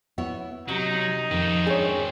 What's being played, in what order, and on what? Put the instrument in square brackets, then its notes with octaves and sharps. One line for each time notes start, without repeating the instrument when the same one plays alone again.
[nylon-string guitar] B3 E4 C#5
[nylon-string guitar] C3 [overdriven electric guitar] F#3 [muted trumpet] D#4
[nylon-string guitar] F2 [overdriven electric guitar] D#3 C4
[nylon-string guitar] D4 E4 D5 [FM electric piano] G#4 C#5